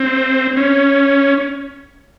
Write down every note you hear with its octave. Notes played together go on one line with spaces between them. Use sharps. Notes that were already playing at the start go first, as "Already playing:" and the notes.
Already playing: C4
C#4